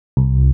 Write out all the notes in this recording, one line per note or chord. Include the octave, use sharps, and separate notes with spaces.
C2